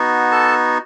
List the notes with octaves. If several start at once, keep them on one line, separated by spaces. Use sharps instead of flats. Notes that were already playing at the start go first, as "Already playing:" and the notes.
Already playing: B3 D#4 F#4
A4 A5